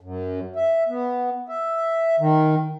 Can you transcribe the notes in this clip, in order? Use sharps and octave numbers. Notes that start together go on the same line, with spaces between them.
F#2
E5
B3
E5
D#3